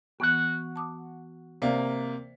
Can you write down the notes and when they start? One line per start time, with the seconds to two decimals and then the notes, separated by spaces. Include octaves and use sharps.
0.20 E3 B3 F#4 F#5
0.76 A5 D6 D#6
1.62 C3 A#3 C5 D5 F5